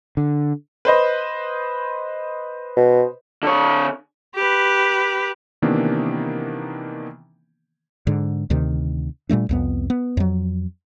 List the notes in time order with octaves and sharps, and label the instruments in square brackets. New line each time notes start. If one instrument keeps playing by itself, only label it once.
[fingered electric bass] D3
[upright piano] B4 C5 D#5
[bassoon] B2
[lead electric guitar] D3 C#5
[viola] G4 B4
[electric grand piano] C3 D#3 E3 A#3 B3 D4
[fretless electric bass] G#2 D3
D2 C3 D#3
A#2 G3 A3 D4
C2 F2 B3
B3
F2 F#3